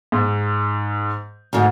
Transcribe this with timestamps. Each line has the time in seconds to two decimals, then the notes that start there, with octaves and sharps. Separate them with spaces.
0.12 G#2
1.53 D2 G#2